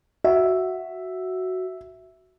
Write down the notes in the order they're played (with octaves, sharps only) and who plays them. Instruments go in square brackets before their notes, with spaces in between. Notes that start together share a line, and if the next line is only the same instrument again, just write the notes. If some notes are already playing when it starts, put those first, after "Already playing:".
[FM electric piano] F#4 [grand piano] E5